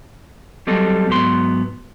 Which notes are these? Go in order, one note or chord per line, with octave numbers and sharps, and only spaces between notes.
F#3 G3 C4 A4 D#5
G#2 F#3 B3 C6